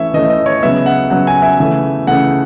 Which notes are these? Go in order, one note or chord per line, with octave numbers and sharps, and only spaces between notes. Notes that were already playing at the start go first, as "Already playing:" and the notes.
Already playing: E3 A3 C#4 C#5 E5
E3 A3 C#4 D#5
D#5
C#5
C#3 F#3 B3 E5
F#5
C#3 F#3 B3 F#5
G#5
E5
C#3 E3 A3
C#3 E3 A3 F#5